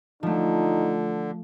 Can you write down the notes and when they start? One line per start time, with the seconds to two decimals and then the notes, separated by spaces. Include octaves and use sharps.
0.23 D3 F3 A3 D#4